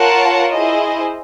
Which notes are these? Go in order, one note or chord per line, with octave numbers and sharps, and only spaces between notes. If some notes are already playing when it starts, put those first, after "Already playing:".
Already playing: F4 A#4 C#5 F#5 A5
E4 G#4 C5 D#5